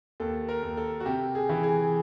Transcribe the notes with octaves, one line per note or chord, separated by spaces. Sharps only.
D#2 A4
A#4
D#2
A4
F#4
C3 G4
G#4
E3
G#4